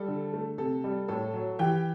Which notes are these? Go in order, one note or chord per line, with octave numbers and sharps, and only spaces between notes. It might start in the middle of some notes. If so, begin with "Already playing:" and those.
Already playing: G3 A4
D3
A3
C3 A4
G3
A2 A4
F#3
E3 G4 G5